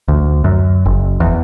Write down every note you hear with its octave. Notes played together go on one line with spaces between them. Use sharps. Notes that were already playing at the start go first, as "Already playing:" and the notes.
D2
F#2
F#1
E2